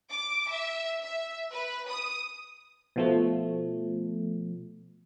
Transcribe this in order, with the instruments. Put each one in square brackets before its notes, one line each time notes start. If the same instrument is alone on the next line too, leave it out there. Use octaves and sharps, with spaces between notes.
[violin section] D6
E5
E5
B4
D#6
[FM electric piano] B2 F3 A3